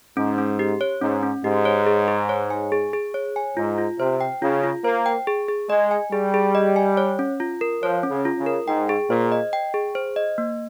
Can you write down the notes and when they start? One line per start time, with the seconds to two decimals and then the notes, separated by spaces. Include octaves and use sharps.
0.17 G#2 C#4
0.38 C#4
0.59 G4
0.81 C#5
1.02 G#2 C#4
1.23 C#4
1.44 G#2 G4
1.65 C#5
1.86 G#4
2.08 G#4
2.29 C#5
2.50 G#5
2.72 G#4
2.93 G#4
3.14 C#5
3.36 G#5
3.57 G#2 F4
3.78 F4
3.99 C3 C5
4.21 G5
4.42 C#3 F4
4.63 F4
4.85 A#3 C5
5.06 G5
5.27 G#4
5.48 G#4
5.70 G#3 D#5
5.91 G#5
6.12 G3 G#4
6.34 G#4
6.55 D#5
6.76 G#5
6.97 C#5
7.19 C#4
7.40 F4
7.61 A#4
7.83 F3 C#5
8.03 C#4
8.11 C#3
8.25 F4
8.39 C#3
8.46 A#4
8.68 G#2 G5
8.89 G#4
9.10 A#2 C5
9.32 D#5
9.53 G5
9.74 G#4
9.95 C5
10.16 D#5
10.38 A#3